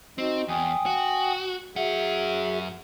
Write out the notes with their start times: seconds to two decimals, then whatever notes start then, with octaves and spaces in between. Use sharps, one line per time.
0.18 C4 D#4 F#4 D#5
0.48 E2 G5 G#5 D#6
0.86 F#4
1.76 F#2 F#4 G#4 E5 F#5